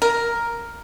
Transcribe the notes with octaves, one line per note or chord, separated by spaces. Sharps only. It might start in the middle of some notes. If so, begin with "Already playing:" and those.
A#4